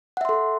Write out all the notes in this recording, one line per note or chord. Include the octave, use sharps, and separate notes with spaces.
A4 E5 F#5 C6